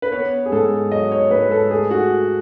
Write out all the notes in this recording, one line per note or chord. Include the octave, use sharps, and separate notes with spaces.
B4
B3 C#5
G#4
G#2 A4
F#3 D#5
C#5
G#2 B4
A4
A3 G#4
F#4